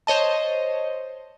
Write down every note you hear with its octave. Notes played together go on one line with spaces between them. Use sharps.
C5 C#5 D#5 A5